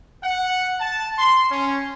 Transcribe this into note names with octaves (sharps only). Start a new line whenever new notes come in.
F#5
A5
C6
C#4